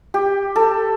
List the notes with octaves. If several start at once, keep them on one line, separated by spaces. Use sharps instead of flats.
G4
A4